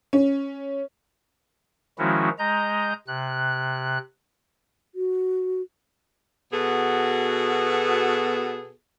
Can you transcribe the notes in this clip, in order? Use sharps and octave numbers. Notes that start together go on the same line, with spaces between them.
C#4
D#3 F3 G#3 C#4 E4 F#4
G#3 D#5 A#5 G6
C3 F#6
F#4
B2 B3 F#4 G#4 A4